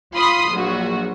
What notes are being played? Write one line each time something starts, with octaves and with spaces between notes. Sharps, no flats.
F4 B5 C6 D#6
A#1 F#3 F#4